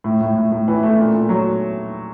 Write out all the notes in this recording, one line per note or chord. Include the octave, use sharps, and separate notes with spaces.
A2
A2
A2
A2
E3
A3
A#2
A#2
F#3